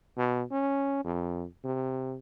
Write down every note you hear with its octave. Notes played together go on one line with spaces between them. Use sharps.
B2
C#4
F2
C3